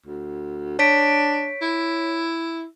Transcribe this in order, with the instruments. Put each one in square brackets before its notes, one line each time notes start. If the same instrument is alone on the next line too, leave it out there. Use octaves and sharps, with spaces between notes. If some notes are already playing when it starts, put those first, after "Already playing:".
[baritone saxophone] D2
[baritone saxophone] D4 [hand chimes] C#5 B6 D7
[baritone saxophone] E4